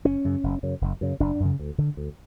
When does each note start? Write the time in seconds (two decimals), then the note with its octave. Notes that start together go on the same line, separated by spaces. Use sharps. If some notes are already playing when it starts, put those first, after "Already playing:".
0.05 F#1 C#4
0.24 F#2 C#3
0.43 F#1
0.63 F#2 C#3
0.81 F#1
1.01 F#2 C#3
1.20 F#1 D4
1.40 F#2 C#3
1.59 D2
1.78 D3
1.97 D2